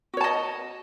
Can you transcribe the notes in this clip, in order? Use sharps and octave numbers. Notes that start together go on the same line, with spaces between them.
F#4 C#5 D#5 A5